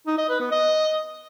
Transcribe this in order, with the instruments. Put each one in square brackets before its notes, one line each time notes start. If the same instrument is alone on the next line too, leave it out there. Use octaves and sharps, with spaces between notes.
[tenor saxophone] D#4
D#5
B4
B3
D#5